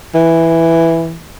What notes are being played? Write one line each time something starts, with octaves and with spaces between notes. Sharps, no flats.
E3